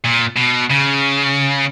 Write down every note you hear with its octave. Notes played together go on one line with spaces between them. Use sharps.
A#2
B2
C#3